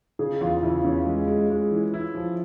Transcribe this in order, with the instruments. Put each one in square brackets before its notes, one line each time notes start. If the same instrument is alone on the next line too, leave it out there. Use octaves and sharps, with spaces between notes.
[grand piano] C#3 [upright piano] G#4
[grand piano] E2 [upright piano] F4
[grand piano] C#3 [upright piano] E4
[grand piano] E2 [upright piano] C#4
[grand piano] G#3
G#3
G#3
E3
E4
F3